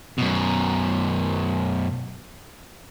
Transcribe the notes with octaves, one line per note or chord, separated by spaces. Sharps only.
F#2 B2